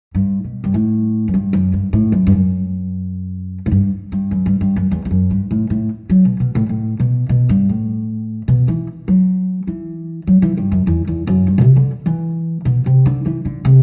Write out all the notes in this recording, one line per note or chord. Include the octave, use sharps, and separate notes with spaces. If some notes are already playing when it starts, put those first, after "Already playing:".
G2
B2
G2
A2
F#2
G2
F#2
G2
A2
F#2
G2
F#2
A2
G2
G2
F#2
G2
G2
F#2
E2
E2
F#2
G2
A2
A2
F#3
B2
B2
A2
A2
B2
B2
G2
A2
B2
E3
F#3
E3
F#3
E3
G2
F#2
E2
E2
F#2
G2
B2
C3
D3
E3
B2
C3
D3
E3
D3
C3